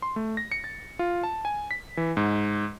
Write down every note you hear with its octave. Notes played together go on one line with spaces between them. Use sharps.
C6
A3
A#6
C#7
A6
F4
A5
G#5
B6
E3
G#2